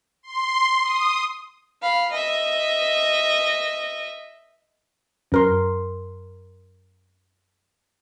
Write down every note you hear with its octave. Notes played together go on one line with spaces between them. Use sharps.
C6
D#6
F5 B5
D#5 E5
F#2 A#4 C6